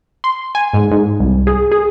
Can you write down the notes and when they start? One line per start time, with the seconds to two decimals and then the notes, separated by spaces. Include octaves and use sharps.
0.24 C6
0.55 G#5
0.74 G#2
0.92 G#2
1.20 C2
1.47 G#4
1.72 G#4